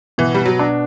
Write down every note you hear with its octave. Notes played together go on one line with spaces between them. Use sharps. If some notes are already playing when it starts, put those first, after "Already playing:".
B2 E3
G3
F#3
D4